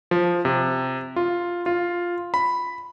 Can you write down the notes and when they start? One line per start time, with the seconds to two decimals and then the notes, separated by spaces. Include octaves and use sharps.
0.11 F3
0.45 C3
1.16 F4
1.66 F4
2.34 B5